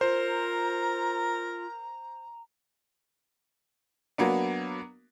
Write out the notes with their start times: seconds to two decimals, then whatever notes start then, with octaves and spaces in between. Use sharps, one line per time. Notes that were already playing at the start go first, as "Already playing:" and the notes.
0.01 F4 A#4 C5 A#5
4.18 F#3 A#3 B3 D4